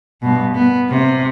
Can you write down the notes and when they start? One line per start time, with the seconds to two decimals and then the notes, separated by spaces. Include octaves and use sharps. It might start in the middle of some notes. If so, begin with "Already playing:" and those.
0.22 G2 B2
0.55 B3
0.90 C3